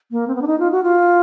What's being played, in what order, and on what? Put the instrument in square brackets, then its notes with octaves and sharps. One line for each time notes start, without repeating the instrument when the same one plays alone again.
[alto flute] A#3
C4
B3
D4
D#4
F4
F#4
F4